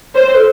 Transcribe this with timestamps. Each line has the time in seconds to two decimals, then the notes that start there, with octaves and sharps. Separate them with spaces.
0.15 C5 C#5
0.25 C5
0.35 A4